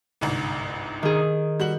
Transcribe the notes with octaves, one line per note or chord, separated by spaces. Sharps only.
G1 C2 G#2
D#3 G#4
G3 F#4 F#7